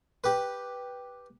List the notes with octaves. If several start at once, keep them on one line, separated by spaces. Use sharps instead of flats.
G4 B4